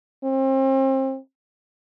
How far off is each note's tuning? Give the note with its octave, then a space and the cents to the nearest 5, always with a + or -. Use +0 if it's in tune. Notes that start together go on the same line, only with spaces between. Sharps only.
C4 +35